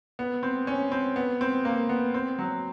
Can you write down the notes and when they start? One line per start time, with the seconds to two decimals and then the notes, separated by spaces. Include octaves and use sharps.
0.19 B3
0.43 C4
0.67 C#4
0.92 C4
1.16 B3
1.41 C4
1.65 A#3
1.89 B3
2.14 C4
2.39 F#3